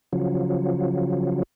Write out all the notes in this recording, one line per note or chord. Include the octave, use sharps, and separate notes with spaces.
C#3 F3 F#3